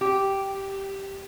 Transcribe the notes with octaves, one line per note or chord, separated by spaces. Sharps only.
G4